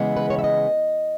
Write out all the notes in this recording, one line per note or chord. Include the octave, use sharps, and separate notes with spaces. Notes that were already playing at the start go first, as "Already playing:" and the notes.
Already playing: C#3 E3 G#3 B3
B4
C#5
E5
D#5